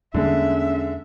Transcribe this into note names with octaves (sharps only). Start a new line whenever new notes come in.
E2 D3 G3 G#3 A#3 C#4 E5